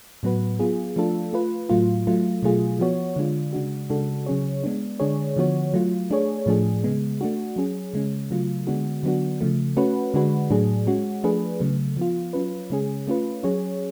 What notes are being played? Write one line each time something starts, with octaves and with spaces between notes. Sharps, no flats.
A2 F#3 B3 F#4 B4
F#3 B3 F4 G#4
F3 A3 D4 F4 A4
A3 F4 B4
A2 F#3 A3 F4
F#3 A3 F4
B2 F#3 A3 F4 G#4
F3 B3 F#4 C#5
D3 G#3 D4 F4
C#3 G#3 D4 F#4
C#3 G#3 D4 F#4 A4
C#3 F#3 C#4 G#4 C#5
G#3 B3 D4
D3 G#3 D4 G#4 C#5
D3 F3 B3 F#4 C#5
F#3 A3 F4
A3 D4 G#4 C#5
A2 F3 A3 D4 G#4
C#3 G#3 B3
A3 D4 F#4
F#3 C#4 G#4
C#3 G#3 C#4
C#3 F#3 A3 F4
D3 G#3 B3 D4 F#4
D3 F#3 B3 D4 F#4
C#3 F3 A3
A3 C#4 F#4 B4
D3 G#3 D4 F#4 B4
A2 F#3 A3 D4 G#4
G#3 C#4 F#4
F3 A3 D4 G#4 B4
C#3 F#3 A3
F3 B3 F4
F#3 C#4 F4 B4
C#3 G#3 C#4 G#4
A3 C#4 F4 B4
F#3 C#4 G#4 C#5